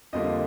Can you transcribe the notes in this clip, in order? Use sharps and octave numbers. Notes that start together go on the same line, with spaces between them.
F2 D3 G3 A#3 F4 D#5